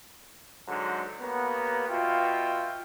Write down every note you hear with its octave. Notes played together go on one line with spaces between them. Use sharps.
G#2 D3 F#3
A#3 B3 G4 C#5 A#5
B2 F4 E5 G5